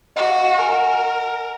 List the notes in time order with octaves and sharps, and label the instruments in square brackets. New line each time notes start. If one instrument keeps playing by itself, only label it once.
[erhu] F#4 [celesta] D#5
[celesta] F5
F#5
[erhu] A#4 [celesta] G#5
[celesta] F#5
G#5